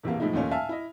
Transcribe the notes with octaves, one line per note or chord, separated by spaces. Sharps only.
E1 E2 C3 A#3
A2 D#3 F3 G#3 D#4 E4
D#2 A#2 A3 A#3 C#4 D#4
E5 F5 G#5 A5 F6
E4 D#5